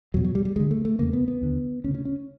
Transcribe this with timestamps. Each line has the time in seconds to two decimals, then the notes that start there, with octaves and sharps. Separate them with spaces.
0.14 E2 F#3
0.17 B2
0.25 F#3
0.35 G3
0.45 G3
0.56 D2 D3 G#3
0.71 A3
0.85 A3
0.99 E2 C#3 A#3
1.13 B3
1.28 B3
1.41 D#2 D3
1.84 D2 C#4
1.88 C#3
1.94 C#4
2.05 C#4